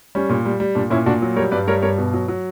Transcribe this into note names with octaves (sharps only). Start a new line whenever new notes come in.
G3 C#4
A#2
G3
G3
A#2 D4
A#2 C#4 E4
A#2 D4 F#4
F#3
G3 A#4 C#5
G2 B4 D5
G3 A#4 C#5
G2 A#4 C#5
B2
F#3
F#3